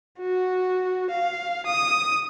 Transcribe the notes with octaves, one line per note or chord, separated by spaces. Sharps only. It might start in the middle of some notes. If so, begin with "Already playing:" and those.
F#4
F5
D#6